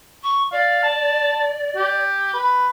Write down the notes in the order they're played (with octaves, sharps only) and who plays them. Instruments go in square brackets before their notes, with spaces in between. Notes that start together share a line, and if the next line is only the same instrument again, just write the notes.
[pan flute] C#6
[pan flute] D5 [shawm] F5
[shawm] A5
G4
B4